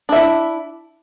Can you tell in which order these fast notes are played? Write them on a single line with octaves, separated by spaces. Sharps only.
D4 E5 E4